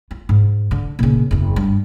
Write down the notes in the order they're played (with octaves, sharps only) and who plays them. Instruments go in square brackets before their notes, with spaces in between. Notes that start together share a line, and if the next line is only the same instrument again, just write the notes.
[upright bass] F4
G#2
D3
A#2 C#3
F#1 E2
G2